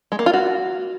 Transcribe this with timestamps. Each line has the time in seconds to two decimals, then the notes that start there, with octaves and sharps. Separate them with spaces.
0.12 G#3
0.19 A#3
0.26 F4
0.33 F#4